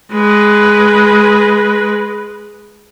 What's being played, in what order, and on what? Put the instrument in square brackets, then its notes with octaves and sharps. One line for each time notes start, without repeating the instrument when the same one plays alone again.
[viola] G#3 B4